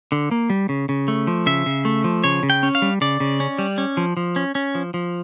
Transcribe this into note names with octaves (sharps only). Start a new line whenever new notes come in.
D3
A#3
G3
C#3
C#3
A3
F3
C#3 E5
C#3
A3
F3
C#3 C#5
C#3
G5
C#4
F5
G3
C#3 D5
C#3
C#4
G3
C#4
F3
F3
C#4
C#4
F3
F3